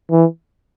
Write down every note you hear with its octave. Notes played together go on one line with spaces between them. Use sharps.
E3